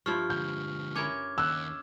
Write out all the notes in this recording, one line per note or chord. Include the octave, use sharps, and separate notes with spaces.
G2 F3 E4 C#6 F6
D3 G#3 G6
C#4 E4 A#4 D6 G#6
D#2 E6 F#6